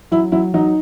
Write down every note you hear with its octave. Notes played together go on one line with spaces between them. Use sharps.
F#3 E4
F#3 E4
F#3 D#4